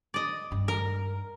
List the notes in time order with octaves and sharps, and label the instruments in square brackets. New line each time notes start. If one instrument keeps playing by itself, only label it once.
[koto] D5 D#5
[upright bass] G2 D#4
[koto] A#4